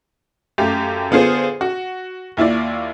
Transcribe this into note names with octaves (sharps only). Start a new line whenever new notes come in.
F#2 A3 G4 F5
D3 B3 F4 G#4 C5
F#4
D#2 E4 F4 D5